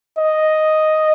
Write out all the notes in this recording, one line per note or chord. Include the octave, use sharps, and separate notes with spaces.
D#5